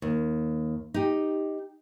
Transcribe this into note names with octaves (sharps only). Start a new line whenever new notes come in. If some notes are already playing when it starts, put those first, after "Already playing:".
D#2
D#4 G4